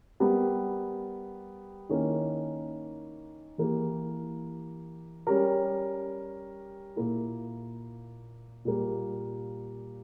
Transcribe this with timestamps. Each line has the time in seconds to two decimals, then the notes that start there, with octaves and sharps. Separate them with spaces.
0.20 G3 B3 G4 A#4
1.89 D#3 A#3 C#4 E4
3.58 E3 A#3 E4 G4
5.27 G3 C#4 G4 A#4
6.96 A#2 A#3 E4
8.65 A#2 G3 A#3